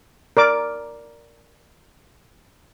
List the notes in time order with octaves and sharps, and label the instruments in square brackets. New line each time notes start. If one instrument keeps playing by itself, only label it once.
[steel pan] A#4 D5 D6